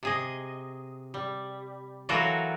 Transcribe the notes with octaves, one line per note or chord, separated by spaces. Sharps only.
C3 G#4 D#5
G3
E3 F#3 F4 F#4 A4 A#4